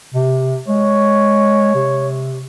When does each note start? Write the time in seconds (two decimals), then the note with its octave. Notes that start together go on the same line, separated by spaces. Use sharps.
0.14 C3
0.68 G#3 C#5
1.75 C3